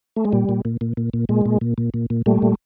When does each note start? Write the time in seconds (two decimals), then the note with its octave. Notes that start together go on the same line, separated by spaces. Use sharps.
0.16 A3
0.25 G#3
0.32 A#2 G3
0.49 A#2
0.65 A#2
0.81 A#2
0.97 A#2
1.13 A#2
1.29 A#2 G#3
1.46 A#2
1.61 A#2
1.78 A#2
1.94 A#2
2.10 A#2
2.26 A#2 G3 A3
2.42 A#2